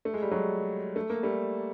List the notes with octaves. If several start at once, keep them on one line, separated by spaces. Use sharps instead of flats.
A3
G#3
G3
F#3 G#3
A3
A#3
G3 A3